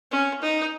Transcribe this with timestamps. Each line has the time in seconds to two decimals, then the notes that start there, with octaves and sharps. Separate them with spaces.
0.11 C#4
0.42 D#4